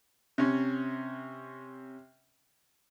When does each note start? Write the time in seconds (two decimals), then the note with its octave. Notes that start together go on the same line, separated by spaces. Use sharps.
0.38 C3 C#4